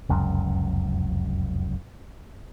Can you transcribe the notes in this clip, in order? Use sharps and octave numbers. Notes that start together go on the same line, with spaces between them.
F1 C#2 F#2